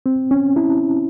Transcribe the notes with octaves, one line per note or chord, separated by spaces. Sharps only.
C4
C#4
E4